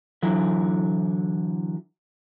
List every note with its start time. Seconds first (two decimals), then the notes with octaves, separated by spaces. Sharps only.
0.23 D3 E3 F#3 E4